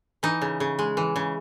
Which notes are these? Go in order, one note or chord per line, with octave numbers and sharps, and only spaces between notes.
E3 D#4
C#3
C#3
G#3
E3
C#3